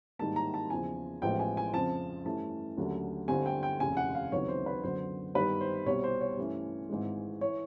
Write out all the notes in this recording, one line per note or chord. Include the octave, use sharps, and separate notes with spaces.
G#2 D#3 G3 A#3 A5
A#5
A5
E2 C#3 F3 G#5
A1 A2 F3 G#3 B3 G5
G#5
G#5
F2 C#3 F3 A5
G2 E3 A3 C#4 A5
D#2 D3 F#3 A3 C#4
G1 G2 D3 G3 C4 G#5
G5
G5
F1 D#2 C#3 G#5
F#5
F5
C#2 C3 D#3 F#3 B3 C#5
C5
B4
F#2 D3 F#3 B3 C5
G2 D#3 G3 B3 B4
C5
C2 B2 G3 C4 C#5
C5
C#5
G2 E3 A3 C#4
G#1 G#2 E3 G#3
E3 C#5